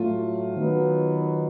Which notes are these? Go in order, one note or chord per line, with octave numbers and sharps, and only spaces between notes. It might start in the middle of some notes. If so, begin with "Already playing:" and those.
Already playing: A2 F#3 A3 F4
D#3 F#3 B3 D#4